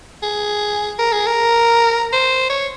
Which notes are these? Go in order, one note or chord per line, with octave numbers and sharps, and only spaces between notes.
G#4
A#4
G#4
A#4
C5
C#5